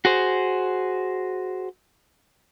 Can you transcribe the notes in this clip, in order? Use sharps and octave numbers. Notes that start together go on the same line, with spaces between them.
F#4 G#4 C5